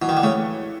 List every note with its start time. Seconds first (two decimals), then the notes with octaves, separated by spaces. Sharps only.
0.01 B2 E3
0.09 D#3
0.17 D3
0.23 C#3 A3